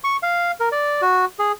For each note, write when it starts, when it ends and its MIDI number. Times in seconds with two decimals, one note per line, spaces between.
0.04 0.17 85
0.23 0.52 77
0.60 0.69 70
0.72 1.01 74
1.02 1.25 66
1.39 1.52 68